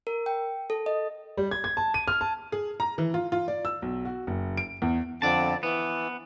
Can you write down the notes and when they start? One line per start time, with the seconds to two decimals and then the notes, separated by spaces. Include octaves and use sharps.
0.07 A#4
0.26 G5
0.70 A4
0.86 D#5
1.37 G3
1.51 G#6
1.64 G#6
1.77 A5
1.94 D#7
2.08 F6
2.21 A5
2.52 G#4
2.80 A#5
2.98 E3
3.14 F4
3.32 F4
3.48 D5
3.65 E6
3.82 B1
4.05 F#4
4.27 F#1
4.57 D7
4.82 E2
5.22 F2 D3 D5 A5
5.63 E3 B3